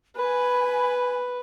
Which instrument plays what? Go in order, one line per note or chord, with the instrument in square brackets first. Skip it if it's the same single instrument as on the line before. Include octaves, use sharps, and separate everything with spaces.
[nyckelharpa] B4 [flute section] G#5 B5